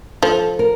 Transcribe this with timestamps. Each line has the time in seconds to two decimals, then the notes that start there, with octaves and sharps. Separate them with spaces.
0.23 F3 A4
0.59 A#4